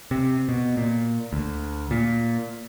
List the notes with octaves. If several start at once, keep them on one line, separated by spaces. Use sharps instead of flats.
C3
B2
A#2
D2
A#2